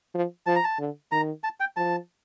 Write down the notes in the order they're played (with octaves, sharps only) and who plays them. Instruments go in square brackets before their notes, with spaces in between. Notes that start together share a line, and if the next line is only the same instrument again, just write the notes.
[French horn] F3
[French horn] F3 [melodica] A5
[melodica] A#5
A5
[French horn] D3
[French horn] D#3 [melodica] A#5
[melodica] A5
G5
[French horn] F3 [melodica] A5